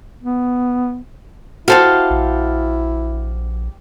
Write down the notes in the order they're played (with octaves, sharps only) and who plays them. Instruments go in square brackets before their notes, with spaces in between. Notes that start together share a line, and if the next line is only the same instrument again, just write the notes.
[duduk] B3
[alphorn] E4 [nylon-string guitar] F#4 C5 [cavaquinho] G4 A4 F5
[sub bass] A#1